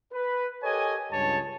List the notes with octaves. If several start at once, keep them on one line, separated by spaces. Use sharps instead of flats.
B4
G4 A4 A#4 C#5 D#5 G#5
C#2 G2 C#5 A5